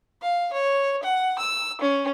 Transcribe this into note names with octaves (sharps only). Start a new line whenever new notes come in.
F5
C#5
F#5
E6
C#4